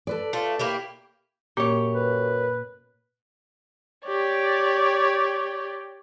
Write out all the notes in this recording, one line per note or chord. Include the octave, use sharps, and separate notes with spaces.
A4 B4 D5
A3 F4
A#3 E4 G4
F#2 A#2 A#3 G4 C#5
B4
G4 C#5 D5